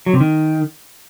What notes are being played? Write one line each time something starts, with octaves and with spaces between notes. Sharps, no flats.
F#3
C3
D#3